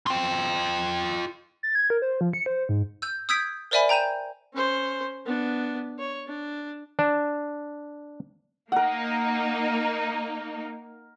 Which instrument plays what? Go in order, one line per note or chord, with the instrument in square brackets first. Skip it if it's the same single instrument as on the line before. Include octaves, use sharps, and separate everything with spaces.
[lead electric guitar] F4 G5
[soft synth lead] A6
G#6
A#4
C5
F3
C#7
C5
G#2
[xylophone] E6 G6
D#6 E6 G6 G#6 B6 D7
A#4 C5 D5 E5 G#5 B5
G5 A#5 G6 D#7 E7
[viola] C#4 C5
B3 D4
C#5
D4
[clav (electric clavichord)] D4
[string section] A#3 D#4 [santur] A#4 F#5